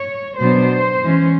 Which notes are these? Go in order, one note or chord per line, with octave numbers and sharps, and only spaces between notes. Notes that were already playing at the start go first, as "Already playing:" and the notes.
Already playing: C#5
B2 F#3 B3 D4 C5
E3 G#3 C#4